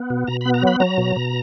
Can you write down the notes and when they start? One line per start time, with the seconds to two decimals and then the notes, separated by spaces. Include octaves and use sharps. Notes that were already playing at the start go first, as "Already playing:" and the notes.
Already playing: B3
0.10 B2
0.27 B2 A#5
0.41 B5
0.46 B3
0.54 A#5
0.62 F#3 B5
0.80 F#3 A#5
0.98 B2
1.16 B2